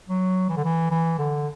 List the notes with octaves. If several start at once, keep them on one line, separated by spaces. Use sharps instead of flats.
F#3
E3
D3
E3
E3
D3